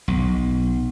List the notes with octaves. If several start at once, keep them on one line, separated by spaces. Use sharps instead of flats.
B1